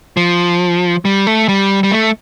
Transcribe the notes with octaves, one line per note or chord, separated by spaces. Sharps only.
F3
G3
A3
G3
G3
A3